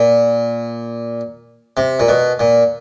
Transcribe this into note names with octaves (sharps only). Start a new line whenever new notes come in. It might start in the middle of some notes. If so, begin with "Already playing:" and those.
Already playing: A#2
C3
A#2
B2
A#2